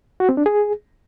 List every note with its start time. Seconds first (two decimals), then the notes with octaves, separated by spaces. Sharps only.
0.20 F#4
0.29 C4
0.37 D4
0.46 G#4